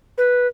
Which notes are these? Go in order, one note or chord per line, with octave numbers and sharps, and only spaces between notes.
B4